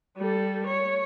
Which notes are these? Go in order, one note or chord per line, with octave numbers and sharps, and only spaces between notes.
G3 A4
C#5